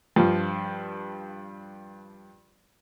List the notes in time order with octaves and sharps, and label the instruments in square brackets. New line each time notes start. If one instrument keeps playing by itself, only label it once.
[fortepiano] G2 F3